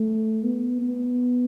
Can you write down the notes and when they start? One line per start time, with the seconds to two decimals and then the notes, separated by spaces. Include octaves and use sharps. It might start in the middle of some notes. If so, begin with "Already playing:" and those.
Already playing: A3
0.44 B3
0.82 B3